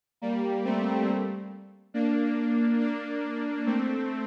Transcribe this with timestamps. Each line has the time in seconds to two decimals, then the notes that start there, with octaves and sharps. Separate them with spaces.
0.22 G3 A#3
0.65 A3 C4
1.94 A#3 D4
2.80 A#3 D4
3.66 A3 C4